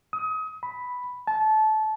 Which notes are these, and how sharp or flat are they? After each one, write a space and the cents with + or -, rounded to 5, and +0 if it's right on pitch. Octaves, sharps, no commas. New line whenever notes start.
D#6 +30
B5 +0
A5 -20